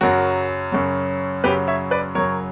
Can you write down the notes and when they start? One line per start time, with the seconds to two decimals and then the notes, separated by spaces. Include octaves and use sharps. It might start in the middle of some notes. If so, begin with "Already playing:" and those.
0.01 F#2 C#3 F#3 F#4 A#4
0.72 F#2 C#3 F#3
1.44 F#2 C#3 F#3 G4 B4
1.68 C#5 E5
1.91 B4 D5
2.15 F#2 C#3 F#3 A#4 C#5